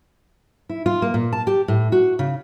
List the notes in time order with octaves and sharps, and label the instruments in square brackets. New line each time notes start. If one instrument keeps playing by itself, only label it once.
[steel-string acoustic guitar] E4
F4
A#3
A#2
A5
G4
A2
F#4
C#3